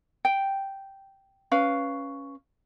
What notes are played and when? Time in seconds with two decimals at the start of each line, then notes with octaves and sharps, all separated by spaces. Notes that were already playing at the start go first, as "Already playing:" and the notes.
0.25 G5
1.51 C#4 B4 F5